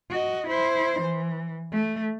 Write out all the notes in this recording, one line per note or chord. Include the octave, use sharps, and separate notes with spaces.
F#4 D#5
E4 C5
E3
A3